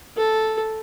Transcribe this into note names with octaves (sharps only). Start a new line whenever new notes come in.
A4